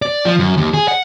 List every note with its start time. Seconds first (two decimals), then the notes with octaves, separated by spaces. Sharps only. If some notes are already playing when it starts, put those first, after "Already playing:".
0.02 D5
0.25 F3
0.39 F#2
0.57 D#2
0.74 G#4
0.88 F#5